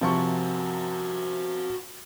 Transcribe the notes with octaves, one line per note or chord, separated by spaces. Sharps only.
C3 F3 F#4 A#4 C#6